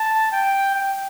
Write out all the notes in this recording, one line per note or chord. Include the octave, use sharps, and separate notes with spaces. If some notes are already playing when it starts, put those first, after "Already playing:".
Already playing: A5
G5
G5